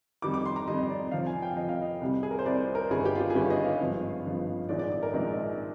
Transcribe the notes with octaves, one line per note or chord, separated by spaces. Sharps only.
F2 D#3 G3 D6
D6
C6
A#5
F2 D#3 G3 D#5
D#5
D5
F2 C3 F3 F5
G#5
G5
F2 C3 F3 D#5
F5
D#5
C2 C3 G3
G#4
A#4
C5
C2 C3 G3 D5
C5
A#4
G1 G2 D#3 G3 G#4
G4
F4
G4
G#4
G1 G2 D#3 G3 G4
D#5
F5
G#1 G2 F3 G#3 F5
G#1 G2 F3 G#3
A#1 G#2 D#3 G#3 D5
D5
D5
A#4
A#1 G#2 D#3 G#3